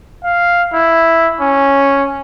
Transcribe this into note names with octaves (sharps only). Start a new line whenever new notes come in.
F5
E4
C#4